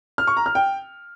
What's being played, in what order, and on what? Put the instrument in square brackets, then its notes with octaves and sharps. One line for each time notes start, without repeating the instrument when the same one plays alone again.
[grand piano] F6
C#6
A#5
F6
G5